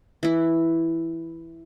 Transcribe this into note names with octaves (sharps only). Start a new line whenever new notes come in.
E3 E4